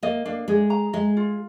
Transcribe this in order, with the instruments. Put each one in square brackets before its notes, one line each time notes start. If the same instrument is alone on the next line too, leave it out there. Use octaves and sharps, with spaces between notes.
[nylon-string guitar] A#3 [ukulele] D#5
[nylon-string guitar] A#3 [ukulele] D4
[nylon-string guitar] G#3 [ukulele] G#4
[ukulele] A#5
[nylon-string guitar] G#3 [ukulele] D#5
[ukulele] F4